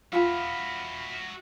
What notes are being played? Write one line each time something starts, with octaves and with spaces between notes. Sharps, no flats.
F4 F#4 E5 G#5 B5 F6